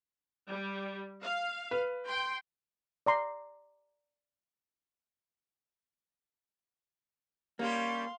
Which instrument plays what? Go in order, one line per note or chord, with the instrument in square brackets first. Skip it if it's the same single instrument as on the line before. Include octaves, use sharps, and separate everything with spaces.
[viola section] G3
F5
[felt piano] B4
[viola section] G5 C6
[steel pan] D5 A#5 C6
[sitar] G3 C#4 G4 [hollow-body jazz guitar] A#3 [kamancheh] F5 C6